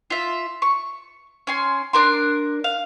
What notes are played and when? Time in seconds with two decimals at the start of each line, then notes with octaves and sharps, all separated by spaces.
0.10 F4 E5
0.62 C#6
1.47 C#4 G#5 C6
1.93 D4 A#4 C6
2.64 F5